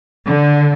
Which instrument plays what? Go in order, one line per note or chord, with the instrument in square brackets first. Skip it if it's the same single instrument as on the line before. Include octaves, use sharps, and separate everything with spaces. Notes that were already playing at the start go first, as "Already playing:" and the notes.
[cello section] D3